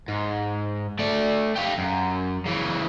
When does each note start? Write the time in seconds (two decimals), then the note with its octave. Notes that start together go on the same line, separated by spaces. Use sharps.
0.08 G#2
0.99 A3 D5
1.56 G4 F5
1.78 F#2
2.45 C#3 E3